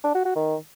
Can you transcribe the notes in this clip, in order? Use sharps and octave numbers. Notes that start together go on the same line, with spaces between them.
D4
F#4
F#4
D#3